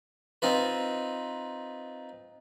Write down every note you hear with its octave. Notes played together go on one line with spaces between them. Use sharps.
C4 D#4 F4 B4